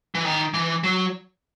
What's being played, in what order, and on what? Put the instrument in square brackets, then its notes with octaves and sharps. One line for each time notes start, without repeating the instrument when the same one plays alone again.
[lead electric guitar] E3
D#3
E3
F#3